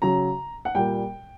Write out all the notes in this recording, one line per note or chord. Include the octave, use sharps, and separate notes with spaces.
C#3 F#3 A#5
F#5
A#2 G3 G5